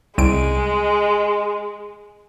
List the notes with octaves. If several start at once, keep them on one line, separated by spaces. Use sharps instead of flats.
C2 G#3 D7